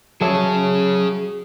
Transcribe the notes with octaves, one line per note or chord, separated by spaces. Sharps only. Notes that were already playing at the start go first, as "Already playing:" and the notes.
F#3 G#4 A4 C#5 E5